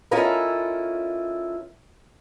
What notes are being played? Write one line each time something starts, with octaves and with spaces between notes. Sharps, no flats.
C#4 E4 F4 A4 A#4 D#5